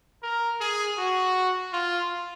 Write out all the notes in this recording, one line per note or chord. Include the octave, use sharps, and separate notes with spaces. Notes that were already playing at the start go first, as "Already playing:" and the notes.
A#4
G#4
F#4
F4